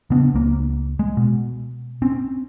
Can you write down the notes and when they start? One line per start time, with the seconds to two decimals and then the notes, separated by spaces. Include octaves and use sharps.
0.10 C#3 B3 D4
0.34 C#2 A#3
0.99 G#3
1.17 B2
2.02 C4 C#4